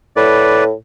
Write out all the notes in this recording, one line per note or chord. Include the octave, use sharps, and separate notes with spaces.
A2 B4 D5